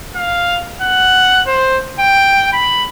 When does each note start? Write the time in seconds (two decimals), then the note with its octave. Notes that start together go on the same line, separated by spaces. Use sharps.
0.16 F5
0.81 F#5
1.47 C5
1.99 G5
2.53 B5